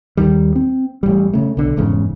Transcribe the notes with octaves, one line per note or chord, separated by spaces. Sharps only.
D#2 D#3 G3
C4
A1 G3
C#3 A3
B1 D3
F1 E2 G#2 C#3